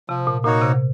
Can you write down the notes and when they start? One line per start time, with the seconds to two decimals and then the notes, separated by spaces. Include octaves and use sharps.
0.09 C3 F3
0.27 A#2
0.44 A#2 A#3 D#4 F#4 C#5
0.62 C3